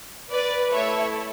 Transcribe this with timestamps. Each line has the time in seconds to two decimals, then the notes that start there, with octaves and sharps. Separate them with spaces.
0.31 B4 D5
0.72 A3 E4 A4 C#5 E5